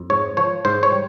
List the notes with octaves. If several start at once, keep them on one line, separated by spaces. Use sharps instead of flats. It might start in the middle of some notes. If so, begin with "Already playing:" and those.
Already playing: F2
G#2 C#5
F3 C#5
G#2 C5
C#5
G3